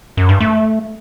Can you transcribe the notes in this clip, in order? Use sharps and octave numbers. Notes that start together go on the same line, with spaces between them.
F#2
G2
A3